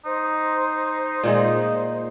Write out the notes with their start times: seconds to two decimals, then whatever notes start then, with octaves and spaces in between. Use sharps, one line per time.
0.06 D#4 C5
1.23 A#2 D#3 G#3